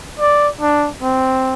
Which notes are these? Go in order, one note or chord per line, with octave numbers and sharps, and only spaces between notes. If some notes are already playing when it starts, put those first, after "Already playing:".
D5
D4
C4